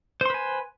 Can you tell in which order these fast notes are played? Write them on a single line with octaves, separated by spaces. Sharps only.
C5 C6 B4 G#5